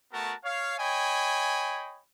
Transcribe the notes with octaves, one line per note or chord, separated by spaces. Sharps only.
A3 B3 F#4 A#4 A5
C#5 F5
C#5 D#5 G5 G#5 B5